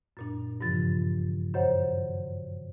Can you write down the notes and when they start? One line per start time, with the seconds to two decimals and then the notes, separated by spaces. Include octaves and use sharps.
0.17 F#2 A#2 D4
0.61 G2 C#3 E3 F3 F4 A6
1.54 F#2 D#3 C5 C#5 F#5